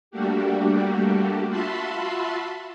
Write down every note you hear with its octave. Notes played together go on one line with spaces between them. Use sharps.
G3 A3 A#3 D4 F#4 G4
F4 F#4 E5 A5 B5 C6